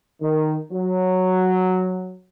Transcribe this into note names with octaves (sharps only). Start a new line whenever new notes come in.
D#3
F#3